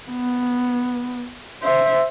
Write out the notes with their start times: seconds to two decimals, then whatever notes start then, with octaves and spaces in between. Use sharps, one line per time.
0.10 B3
1.63 C5 E5